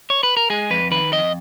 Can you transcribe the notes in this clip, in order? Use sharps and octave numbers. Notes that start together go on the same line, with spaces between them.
C#5
B4
A#4
G#3 G#4
F2 B4
D#3 B4
F2 D#5